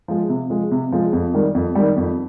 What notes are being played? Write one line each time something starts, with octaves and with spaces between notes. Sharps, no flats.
F3 G#3
C3
F3 G#3
C3
F3 G#3
F2
D#3 G3
F2
D#3 G3
F2